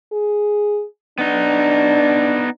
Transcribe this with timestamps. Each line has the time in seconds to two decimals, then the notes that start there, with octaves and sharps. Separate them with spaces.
0.12 G#4
1.19 B3 D4 D#4